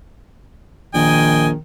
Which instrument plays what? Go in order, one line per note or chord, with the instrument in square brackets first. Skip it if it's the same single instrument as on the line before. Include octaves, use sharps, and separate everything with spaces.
[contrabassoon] A#1 [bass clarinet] D#3 [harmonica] D#5 G5 G#5